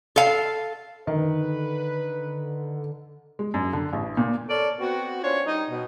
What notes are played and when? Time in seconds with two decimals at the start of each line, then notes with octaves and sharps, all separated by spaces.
0.16 A4 F5
1.07 D3 D#3 B4
3.39 G#3
3.54 F#2
3.73 D3
3.93 A1
4.17 A#2
4.48 A4 A#4 C#5 D5
4.80 B3 C4 F#4
5.22 C#4 D4 F4 C5 C#5
5.46 G3 D#4
5.70 B2